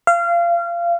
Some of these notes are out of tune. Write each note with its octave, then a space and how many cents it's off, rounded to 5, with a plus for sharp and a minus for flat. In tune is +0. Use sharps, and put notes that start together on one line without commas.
F5 -25